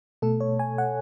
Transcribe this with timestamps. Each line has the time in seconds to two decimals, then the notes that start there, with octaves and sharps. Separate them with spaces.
0.22 B2 A3 A4
0.40 C#5
0.59 G#5
0.78 F#5